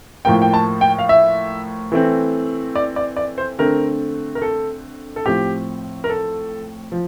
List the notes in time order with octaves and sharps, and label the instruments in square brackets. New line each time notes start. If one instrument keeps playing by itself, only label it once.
[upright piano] A2 F3 A#3 G5
G5
A5
G5
F5
E5
E3 A3 C4
D5
D5
D5
C5
D3 A3 C4 A#4
A#4
A4
A4
A2 F3 C4 G4
A#4
A4
F3